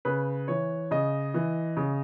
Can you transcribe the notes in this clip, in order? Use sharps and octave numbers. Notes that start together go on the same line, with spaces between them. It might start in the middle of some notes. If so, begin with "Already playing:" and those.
C#3 B4
E3 C#5
C#3 D#5
E3
C#3